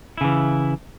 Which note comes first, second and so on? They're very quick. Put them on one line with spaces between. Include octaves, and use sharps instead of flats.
E4 C#3 E3